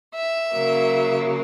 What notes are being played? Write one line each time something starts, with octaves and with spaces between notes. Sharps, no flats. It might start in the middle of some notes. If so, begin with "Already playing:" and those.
E5
C#3 F#3 A#3